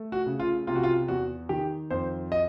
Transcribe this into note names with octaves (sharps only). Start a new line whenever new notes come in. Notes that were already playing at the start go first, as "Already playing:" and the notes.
Already playing: A3
F#4
C#3
F4
C3 F4
F#4
F4
E2 F#4
D#3 G4
F2 C5
D#5